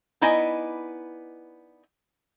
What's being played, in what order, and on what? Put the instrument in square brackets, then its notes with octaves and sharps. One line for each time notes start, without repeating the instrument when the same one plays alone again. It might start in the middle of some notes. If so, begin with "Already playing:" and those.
[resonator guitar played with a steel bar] B3 D#4 E4 D5 D#5 G#5